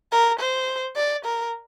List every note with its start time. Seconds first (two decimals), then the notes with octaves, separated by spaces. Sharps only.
0.12 A#4
0.39 C5
0.96 D5
1.25 A#4